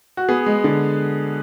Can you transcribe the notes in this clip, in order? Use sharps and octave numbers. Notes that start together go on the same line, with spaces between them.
F#4
B3 G#4
G#3
D3